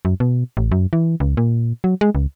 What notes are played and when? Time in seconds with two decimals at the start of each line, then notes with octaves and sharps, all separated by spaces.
0.05 F#2
0.20 B2
0.57 A1
0.72 F#2
0.93 E3
1.20 C#2
1.37 A#2
1.84 F#3
2.01 G#3
2.15 C#2